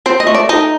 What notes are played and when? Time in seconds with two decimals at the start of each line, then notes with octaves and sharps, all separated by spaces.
0.06 C4 C5
0.20 D#5
0.27 A3
0.34 D5
0.49 D#4 D#5